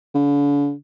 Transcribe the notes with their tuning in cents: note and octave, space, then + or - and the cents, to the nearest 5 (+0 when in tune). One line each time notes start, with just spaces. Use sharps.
D3 -45